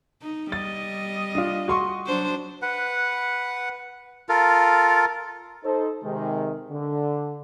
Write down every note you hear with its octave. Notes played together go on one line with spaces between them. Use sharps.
D#4
G3 D#5 A6
D4 F4
F#4 C6 C#6
F#3 D4 C5
B4 F#5
F4 A4 A#4
D#4 A4 C5
C3 D#3 G#3
D3